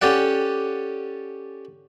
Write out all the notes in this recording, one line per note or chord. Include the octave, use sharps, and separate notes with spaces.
C#4 G4 A4 D5 F#5